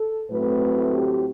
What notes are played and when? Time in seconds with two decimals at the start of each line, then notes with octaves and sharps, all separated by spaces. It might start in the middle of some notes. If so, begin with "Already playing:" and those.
Already playing: A4
0.30 A2 F#3 A3 C4 B4
0.92 G4